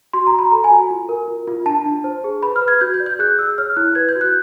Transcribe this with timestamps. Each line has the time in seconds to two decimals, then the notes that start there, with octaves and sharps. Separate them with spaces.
0.13 F#4 C6
0.27 A#5
0.32 F#4
0.39 B5
0.51 A4 A#5
0.64 G#5
0.71 F#4
0.91 F4
1.09 A#4
1.28 F4
1.47 F4
1.66 D4 A5
1.86 D4
2.04 C5
2.24 G#4
2.43 B4 B5
2.56 F6
2.62 B4
2.68 G#6
2.81 F#4 G6
2.94 G6
3.00 D5
3.06 G6
3.19 G#4 F#6
3.38 G#4 E6
3.58 C#5 F6
3.77 E4 F#6
3.95 B4 G#6
4.09 G6
4.15 F#4
4.21 F#6